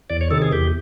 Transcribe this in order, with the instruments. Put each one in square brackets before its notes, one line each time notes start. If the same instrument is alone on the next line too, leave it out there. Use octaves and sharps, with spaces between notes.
[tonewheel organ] E2 D5
C#5
C3 D#3 A4
G#4
E2 G4